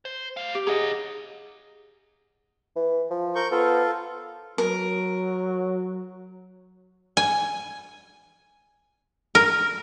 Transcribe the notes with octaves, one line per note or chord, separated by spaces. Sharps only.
C5
G3 F5
G4
D#4 G#4 D#5 F#5
E3
F3
A#4 C#6 G6
B3 F4 A4
F#3 A#4
G#5
A#4